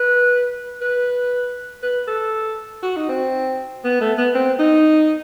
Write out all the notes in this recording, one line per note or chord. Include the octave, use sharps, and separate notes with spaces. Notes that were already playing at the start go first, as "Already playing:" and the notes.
Already playing: B4
B4
B4
A4
F#4
D#4
C4
B3
A3
B3
C4
D#4